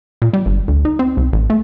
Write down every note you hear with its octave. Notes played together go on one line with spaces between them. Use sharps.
A#2
G3
G1
D2
D#4
C4
C2
A1
A3